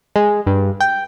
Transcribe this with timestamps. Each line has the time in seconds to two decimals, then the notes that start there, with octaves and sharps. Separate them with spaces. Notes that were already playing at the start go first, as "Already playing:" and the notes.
0.16 G#3
0.47 G2
0.80 G5